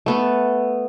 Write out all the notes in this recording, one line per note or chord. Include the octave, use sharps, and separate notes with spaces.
A3 B3 A4